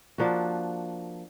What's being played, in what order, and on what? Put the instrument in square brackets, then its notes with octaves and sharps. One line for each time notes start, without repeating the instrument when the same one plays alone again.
[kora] F3 A#3 D4 F#4